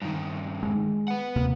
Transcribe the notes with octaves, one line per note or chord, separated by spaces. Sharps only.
G2 D#3
G#3
B4 F#5
D#2 C3 A#3